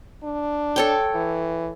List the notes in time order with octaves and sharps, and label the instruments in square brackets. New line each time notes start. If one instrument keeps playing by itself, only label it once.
[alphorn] D4
[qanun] A4 C#5 G5
[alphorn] E3